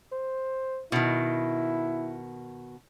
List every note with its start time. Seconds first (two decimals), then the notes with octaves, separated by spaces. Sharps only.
0.12 C5
0.92 B2 D#3 E4